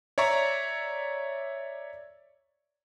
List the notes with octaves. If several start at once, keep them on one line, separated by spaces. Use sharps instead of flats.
C#5 D5 E5 A#5 C#6